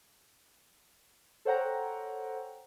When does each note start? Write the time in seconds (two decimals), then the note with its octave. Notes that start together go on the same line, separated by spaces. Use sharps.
1.45 A4 C5 C#5 F#5 G5 A#5